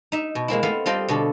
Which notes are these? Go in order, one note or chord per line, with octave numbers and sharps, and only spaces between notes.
D#4 E5
B2
G#3 A#3 C4 E4
A3 B3 C4 A4 F5
G3 C4 F4 A4 D#5 G5
B2 D3 A4